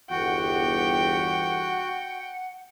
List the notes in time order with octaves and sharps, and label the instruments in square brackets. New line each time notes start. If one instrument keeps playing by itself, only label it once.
[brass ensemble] G1 E2 G4 [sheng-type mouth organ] F#4 [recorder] F#5 [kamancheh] G5